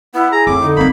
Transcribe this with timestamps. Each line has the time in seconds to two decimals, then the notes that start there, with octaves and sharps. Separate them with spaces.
0.14 B3 E4
0.32 G#4 A#5
0.47 F2 A2 D6
0.61 D3 D#4
0.77 F#3 A#3 C4 B5